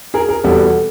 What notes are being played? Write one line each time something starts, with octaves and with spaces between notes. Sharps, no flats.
G#4 A#4
G#4 A#4
E2 B2 G3 B3 A4